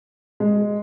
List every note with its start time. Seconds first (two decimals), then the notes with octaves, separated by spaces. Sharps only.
0.40 G#3